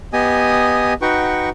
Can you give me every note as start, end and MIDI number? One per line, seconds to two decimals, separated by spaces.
0.13 0.93 59
0.13 0.93 67
0.13 0.93 75
0.13 0.93 80
0.13 0.93 87
1.02 1.49 63
1.02 1.49 66
1.02 1.49 71
1.02 1.49 78
1.02 1.49 79
1.02 1.49 85